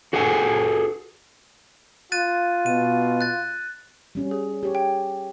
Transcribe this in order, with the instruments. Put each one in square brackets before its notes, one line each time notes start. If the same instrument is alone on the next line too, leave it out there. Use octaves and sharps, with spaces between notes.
[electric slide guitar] F#4 G#4 A4 F#5 G#5
[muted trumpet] F4 [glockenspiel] F#6 A6 D#7
[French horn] B2 [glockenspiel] D#7
[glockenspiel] F#6 A6
[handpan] G3 C#4 F#4
[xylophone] G#4
[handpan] G4 C#5
[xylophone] G5